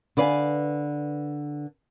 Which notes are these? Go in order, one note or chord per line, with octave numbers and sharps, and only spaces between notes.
D3 B4 D5 F5 G#5